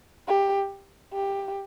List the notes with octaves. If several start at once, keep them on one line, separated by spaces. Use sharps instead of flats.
G4
G4